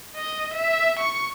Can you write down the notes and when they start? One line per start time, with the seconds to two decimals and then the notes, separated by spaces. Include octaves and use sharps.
0.16 D#5
0.54 E5
0.99 C#6